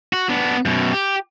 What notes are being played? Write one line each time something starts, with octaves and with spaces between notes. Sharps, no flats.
F#4
B3 D4
F#2 B2
G4